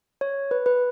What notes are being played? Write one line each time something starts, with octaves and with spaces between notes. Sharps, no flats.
C#5
B4
B4